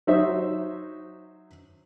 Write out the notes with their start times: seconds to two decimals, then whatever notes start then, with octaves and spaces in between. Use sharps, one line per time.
0.07 F#3 D#4 C5 E5